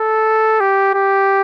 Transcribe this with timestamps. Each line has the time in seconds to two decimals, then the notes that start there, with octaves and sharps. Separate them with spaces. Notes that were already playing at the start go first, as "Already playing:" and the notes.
Already playing: A4
0.60 G4
0.94 G4